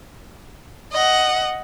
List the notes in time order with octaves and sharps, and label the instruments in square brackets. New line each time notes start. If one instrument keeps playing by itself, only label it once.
[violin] D#5 F#5